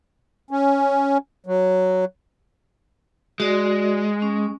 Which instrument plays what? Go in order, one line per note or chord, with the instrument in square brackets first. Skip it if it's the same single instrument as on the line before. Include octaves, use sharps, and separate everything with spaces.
[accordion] C#4
F#3
[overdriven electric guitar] G#3 [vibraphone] F#4 D5
[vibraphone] C#4